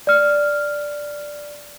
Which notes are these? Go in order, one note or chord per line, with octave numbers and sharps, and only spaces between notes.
D5 F6